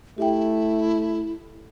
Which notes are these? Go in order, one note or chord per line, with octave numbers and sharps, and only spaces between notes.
A3 E4 G4 E5 G5